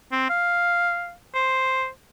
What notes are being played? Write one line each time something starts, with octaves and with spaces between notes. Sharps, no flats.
C4
F5
C5